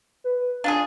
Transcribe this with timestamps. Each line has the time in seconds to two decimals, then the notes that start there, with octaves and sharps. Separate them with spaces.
0.24 B4
0.64 D4 F4 G#4 F5